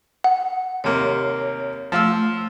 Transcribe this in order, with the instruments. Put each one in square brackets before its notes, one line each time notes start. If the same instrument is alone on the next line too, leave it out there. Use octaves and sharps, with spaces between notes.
[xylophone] F#5
[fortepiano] D#2 C3 A#3 [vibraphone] C#5
[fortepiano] F3 F5 E6 [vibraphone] A3